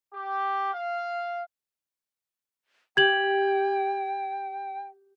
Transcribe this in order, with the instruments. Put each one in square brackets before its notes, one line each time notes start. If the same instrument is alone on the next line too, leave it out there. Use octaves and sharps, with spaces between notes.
[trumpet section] G4
F5
[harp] G4 [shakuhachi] G5 [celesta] G#6 F#7